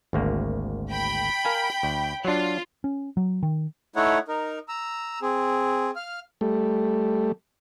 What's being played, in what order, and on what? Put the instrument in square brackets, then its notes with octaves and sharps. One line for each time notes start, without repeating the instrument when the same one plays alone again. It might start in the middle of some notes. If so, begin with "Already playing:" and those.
[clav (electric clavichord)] G#1 D2 A#3
[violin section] G5 B5
[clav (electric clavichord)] A#4 F5 G#5
D2
[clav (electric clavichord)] F#3 D4 [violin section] F4
[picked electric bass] C#4
F#3
D#3
[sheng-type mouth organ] A3 D#4 E4 C#5 F#5
D#4 A#4
A#5 E6
C4 G#4
F5 F6
[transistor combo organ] G3 A3